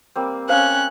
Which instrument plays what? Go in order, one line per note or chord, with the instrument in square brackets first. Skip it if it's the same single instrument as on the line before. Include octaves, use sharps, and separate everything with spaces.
[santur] G3 A#3 C4
[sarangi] C#4 [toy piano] C5 F5 [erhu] F#6